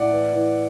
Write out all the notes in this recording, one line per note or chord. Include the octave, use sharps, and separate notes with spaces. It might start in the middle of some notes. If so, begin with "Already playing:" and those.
Already playing: A2 D5 F#5
E3
E3